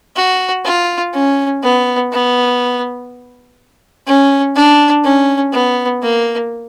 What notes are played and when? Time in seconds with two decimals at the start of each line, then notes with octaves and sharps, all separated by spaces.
0.16 F#4
0.65 F4
1.14 C#4
1.63 B3
2.12 B3
4.07 C#4
4.56 D4
5.04 C#4
5.52 B3
6.02 A#3